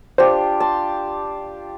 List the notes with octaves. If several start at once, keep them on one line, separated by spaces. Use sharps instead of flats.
D4 F4 G4 C5
A5 C6